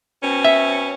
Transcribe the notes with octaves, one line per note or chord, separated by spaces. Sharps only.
B2 C4 C#4
E5